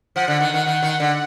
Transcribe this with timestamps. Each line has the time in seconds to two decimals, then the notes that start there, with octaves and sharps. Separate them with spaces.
0.16 F3 F#5
0.28 D3
0.41 D#3
0.54 D#3
0.66 D#3
0.82 D#3
1.00 D3